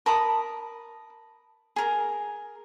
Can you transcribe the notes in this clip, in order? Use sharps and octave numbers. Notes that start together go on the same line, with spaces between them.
A#4 A5 B5 D#6
G#4 A#4